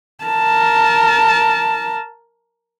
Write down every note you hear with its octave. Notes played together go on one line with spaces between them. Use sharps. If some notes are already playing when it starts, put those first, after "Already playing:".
A#4 A5